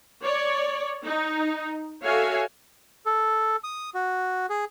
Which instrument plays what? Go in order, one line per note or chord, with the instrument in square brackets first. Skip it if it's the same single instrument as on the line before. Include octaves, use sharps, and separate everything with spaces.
[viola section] C#5 D5
D#4
F#4 A4 C#5 E5 F5 G#5
[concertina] A4
D#6
F#4
G#4